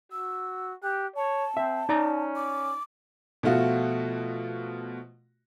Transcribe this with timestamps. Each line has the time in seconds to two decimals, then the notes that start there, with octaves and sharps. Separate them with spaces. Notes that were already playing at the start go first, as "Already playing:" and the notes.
0.12 F#4 E6
0.83 G4 F#6
1.16 C#5 A5
1.57 C4 E5
1.89 C#4 D#4 D5 A#5
2.36 D6
3.43 B2 F3 A3 F4 F#4